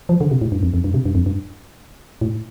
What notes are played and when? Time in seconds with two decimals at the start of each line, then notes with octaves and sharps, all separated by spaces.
0.09 F3
0.21 D3
0.31 C3
0.41 A2
0.52 G2
0.63 F2
0.74 F2
0.84 G2
0.94 C3
1.06 G2
1.15 F2
1.26 G2
2.21 A2